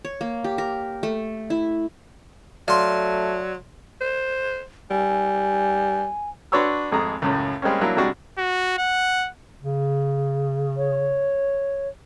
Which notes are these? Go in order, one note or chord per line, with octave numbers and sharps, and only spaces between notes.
C#5
A#3
G4
A#4
A3
E4
F#3 A3 D5 F5 C6
C5
G3 G#5
D4 F#4 B4 C#5 C6 E6
G#1 F2 G#3 A3 G#4 A#5
C#2 F#2 A2
G3 G#3 A#3 C4 C#4
F#3 A#3 D4 E4
C3 G3 G#3 D4 F#4
F#4
F#5
C#3
C#5